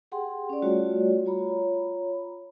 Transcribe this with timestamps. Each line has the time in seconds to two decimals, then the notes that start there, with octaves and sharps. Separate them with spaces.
0.12 G4 G#4 F#5 G5 C6
0.49 C#4 D5
0.62 G3 A3 F4 F#4 C#5 D5
1.26 F4 C#5 A#5 B5